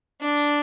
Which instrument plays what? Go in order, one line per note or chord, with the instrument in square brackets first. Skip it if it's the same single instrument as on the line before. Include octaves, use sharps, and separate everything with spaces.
[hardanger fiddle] D4